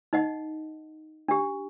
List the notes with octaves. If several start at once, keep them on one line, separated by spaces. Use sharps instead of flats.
D#4 D#5 F#5
D4 G4